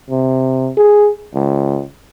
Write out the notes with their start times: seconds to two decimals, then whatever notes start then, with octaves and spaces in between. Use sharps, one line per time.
0.10 C3
0.77 G#4
1.34 C#2